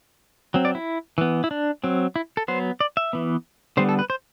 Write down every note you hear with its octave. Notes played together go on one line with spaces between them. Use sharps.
F#3 C4
D5
E4
E3 B3
E4
D4
F#3 C4
E4
A4
F#3 B3 C5
D5
E5
E3 B3
D3 G3 B3 C5
A4
B4
C5